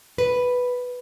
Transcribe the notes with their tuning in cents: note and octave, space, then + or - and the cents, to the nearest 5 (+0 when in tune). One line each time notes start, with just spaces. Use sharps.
B4 +0